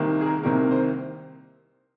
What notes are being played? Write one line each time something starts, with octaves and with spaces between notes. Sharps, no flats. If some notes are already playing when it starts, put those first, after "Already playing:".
Already playing: C2 C3 D#3 A#3
G#4
A#4
C2 C3 D#3 A#3 A#4
C5